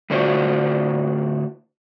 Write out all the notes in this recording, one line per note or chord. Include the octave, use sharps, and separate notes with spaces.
A2 D3 D4 F4 F#4 C5